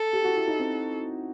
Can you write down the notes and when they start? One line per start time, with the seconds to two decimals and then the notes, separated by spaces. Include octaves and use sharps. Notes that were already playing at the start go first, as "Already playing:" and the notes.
Already playing: A4
0.13 G4
0.24 F#4
0.36 E4
0.48 D#4
0.59 C4